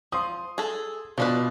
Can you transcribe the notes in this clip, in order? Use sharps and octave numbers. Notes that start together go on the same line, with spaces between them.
F3 C6 D#6
G#4 A4
B2 F3 D4 F4 B4